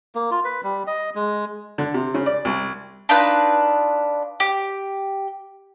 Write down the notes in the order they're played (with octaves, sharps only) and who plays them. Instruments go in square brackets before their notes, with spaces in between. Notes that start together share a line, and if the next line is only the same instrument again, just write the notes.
[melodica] A#3
F4
B4
G3
D#5
G#3
[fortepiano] D3
C3
C#3
D5
C2
[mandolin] D4 D#4 F4 B4
G4